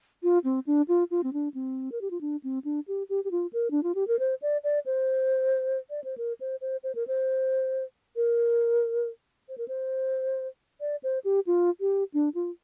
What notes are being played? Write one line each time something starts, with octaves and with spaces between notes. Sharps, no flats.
F4
C4
D4
F4
F4
C4
D4
C4
A#4
G4
F4
D4
C4
D4
G4
G4
G4
F4
A#4
D4
F4
G4
A#4
C5
D5
D5
C5
D5
C5
A#4
C5
C5
C5
A#4
C5
A#4
C5
A#4
C5
D5
C5
G4
F4
G4
D4
F4